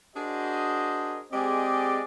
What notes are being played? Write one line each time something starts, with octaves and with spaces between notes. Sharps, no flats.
D4 F#4 G#4 A#4 C5 D#5
G#3 C4 G4 G#4 D5 D#5